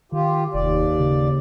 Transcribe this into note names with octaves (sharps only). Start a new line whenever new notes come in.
D#3 F4 G4
F1 D#2 D5
C#3